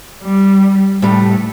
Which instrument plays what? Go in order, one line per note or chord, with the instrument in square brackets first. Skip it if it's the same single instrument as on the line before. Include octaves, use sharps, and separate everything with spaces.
[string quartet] G3
[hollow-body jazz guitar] A2 G3 [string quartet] A3